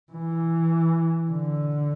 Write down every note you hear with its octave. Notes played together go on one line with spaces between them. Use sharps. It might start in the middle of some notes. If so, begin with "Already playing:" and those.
E3
D3